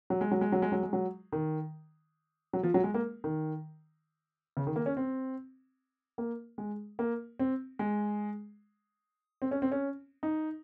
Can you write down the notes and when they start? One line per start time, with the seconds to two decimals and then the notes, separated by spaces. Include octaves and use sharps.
0.10 F#3
0.21 G#3
0.31 F#3
0.41 G#3
0.52 F#3
0.62 G#3
0.72 F#3
0.83 G#3
0.93 F#3
1.32 D#3
2.53 F#3
2.63 F3
2.74 F#3
2.84 G#3
2.94 A#3
3.24 D#3
4.57 C#3
4.67 D#3
4.76 A#3
4.86 C#4
4.97 C4
6.18 A#3
6.58 G#3
6.99 A#3
7.40 C4
7.79 G#3
9.42 C4
9.51 C#4
9.62 C4
9.72 C#4
10.23 D#4